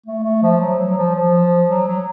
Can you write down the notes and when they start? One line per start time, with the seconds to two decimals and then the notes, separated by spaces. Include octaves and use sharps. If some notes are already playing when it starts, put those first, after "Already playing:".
0.06 A3
0.24 A3
0.42 F3
0.60 F#3
0.79 F#3
0.91 F#3
0.97 F3
1.15 F3
1.69 F#3
1.87 F#3